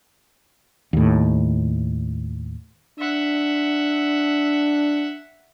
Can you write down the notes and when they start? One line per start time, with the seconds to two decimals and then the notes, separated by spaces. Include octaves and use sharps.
0.93 D#2 A2
2.99 D4 E5 F#5